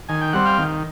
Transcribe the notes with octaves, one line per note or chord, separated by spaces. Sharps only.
D#3 G#5
G5
G3 C4 F#5
F5 G5
D#3